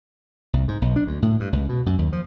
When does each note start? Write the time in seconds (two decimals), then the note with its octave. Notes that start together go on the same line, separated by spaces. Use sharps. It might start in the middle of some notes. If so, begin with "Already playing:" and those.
0.53 C2
0.68 G#2
0.82 B1
0.96 D4
1.07 D2
1.22 A2
1.40 G2
1.53 C#2
1.69 B2
1.86 F#2
1.98 D#2
2.13 F3